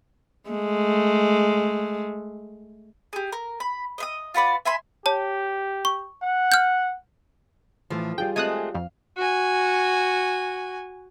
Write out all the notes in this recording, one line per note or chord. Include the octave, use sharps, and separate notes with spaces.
G#3 A3
G4 G#4
A#4
B5
D#5 E5 D#6
F4 F#4 B4 D5
E5 G#5 B5 C6
G4 C#5 A5
C#6
F#5
F6 G6
A2 E3 F3 A3
G3 F4 G#4 G5
G#3 A3 C4 G#5 D#6 F#6
F2 F5
F#4 G#5